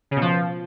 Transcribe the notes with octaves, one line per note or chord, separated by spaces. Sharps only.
C#3
B2
F3